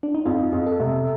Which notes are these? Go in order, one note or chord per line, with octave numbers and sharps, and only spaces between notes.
D4
D#4
F2 F4
F2
A4
C3